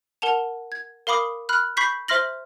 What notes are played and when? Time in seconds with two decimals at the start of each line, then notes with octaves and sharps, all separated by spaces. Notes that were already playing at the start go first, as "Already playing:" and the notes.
0.22 A#4 F#5 A5 F7
0.72 G#6
1.07 A#4 F5 B5 D6 D#6
1.49 B5 F6 F#6
1.77 B5 C#6 G6 B6 C7
2.08 C5 E5 C6 F6 A#6 F#7